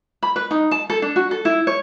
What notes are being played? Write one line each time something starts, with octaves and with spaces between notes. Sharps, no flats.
B5
B4
D#4
A5
A4
D4
F#4
A4
E4
C#5